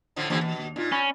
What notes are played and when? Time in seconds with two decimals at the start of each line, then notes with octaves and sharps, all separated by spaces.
0.16 A2 D3 F3
0.30 G2 D3 E3 F3 A#3
0.41 B2
0.59 D#2
0.76 A#2 D4 D#4 F4
0.92 C#4 B5